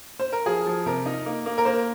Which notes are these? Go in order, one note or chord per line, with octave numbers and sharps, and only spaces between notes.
C5
A#4
F3 G#4
F3
C3 A#4
D#4
A#3
A#3
A#4
A#3 C5